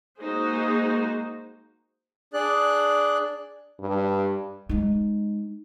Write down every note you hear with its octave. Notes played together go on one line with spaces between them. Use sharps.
G#3 A#3 D#4 F#4 G#4 C5
D4 G#4 D5 F#6
G2
G#3 D#4